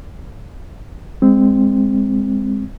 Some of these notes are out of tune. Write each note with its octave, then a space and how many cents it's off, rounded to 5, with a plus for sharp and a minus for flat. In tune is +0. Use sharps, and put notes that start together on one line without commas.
G#3 -20 C4 +0